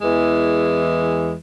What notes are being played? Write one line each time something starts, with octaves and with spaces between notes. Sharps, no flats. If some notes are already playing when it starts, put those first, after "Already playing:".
E2 E3 G#3